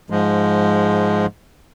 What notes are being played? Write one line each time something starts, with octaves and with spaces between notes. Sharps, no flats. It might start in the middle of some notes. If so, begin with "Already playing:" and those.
G#2 F3 G#3